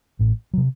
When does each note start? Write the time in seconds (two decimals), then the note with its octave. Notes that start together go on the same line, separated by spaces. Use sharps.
0.19 A1 A2
0.53 F#3
0.57 C3